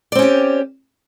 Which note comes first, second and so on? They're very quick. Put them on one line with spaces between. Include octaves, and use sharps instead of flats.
D5 C4 C#4 G4